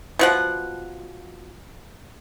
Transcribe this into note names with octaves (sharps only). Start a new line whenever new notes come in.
B2 F3 F#5